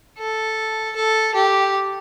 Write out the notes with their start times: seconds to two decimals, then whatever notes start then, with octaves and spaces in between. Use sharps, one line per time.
0.19 A4
0.96 A4
1.35 G4